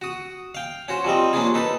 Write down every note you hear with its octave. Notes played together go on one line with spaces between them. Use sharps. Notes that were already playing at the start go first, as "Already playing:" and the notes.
F#4 D#6
F5 G5
C#4 F#4 C5
F3 G3 C4 D#5
A#3 C#4 D4 F4 G#4
D#4 A4 B4